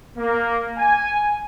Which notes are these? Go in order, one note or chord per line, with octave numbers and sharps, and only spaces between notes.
A#3
G#5